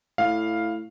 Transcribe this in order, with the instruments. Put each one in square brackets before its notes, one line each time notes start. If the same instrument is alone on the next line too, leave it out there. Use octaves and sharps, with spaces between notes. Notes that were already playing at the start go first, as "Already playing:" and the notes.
[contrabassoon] A2 [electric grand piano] F5